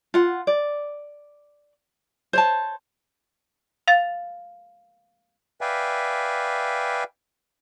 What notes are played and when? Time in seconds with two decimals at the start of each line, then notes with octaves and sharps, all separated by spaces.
0.14 F4 F#5
0.47 D5
2.33 C5 C#5 A5
3.88 F5 A6
5.61 B4 D5 E5 F5 G5 G#5